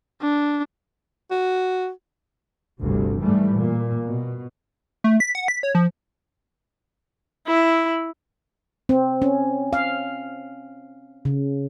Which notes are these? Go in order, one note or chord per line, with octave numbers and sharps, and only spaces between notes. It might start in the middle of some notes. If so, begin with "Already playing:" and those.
D4
F#4
G1 D2 G2 C3
G#2 E3 G3 A3
A#2
B2
A3
B6
F#5
B6
C#5
F3
E4
C4
C#4
F5
C#3